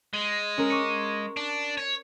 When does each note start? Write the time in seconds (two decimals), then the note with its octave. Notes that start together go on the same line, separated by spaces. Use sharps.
0.14 G#3
0.58 C#4 A#4
0.70 C#6 D6 C#7
1.37 D4
1.78 C#5